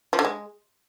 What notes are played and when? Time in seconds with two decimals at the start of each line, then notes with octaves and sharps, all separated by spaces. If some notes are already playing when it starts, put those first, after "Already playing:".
0.13 F3
0.19 D3
0.25 G#3